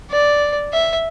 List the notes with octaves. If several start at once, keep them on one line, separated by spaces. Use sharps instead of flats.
D5
E5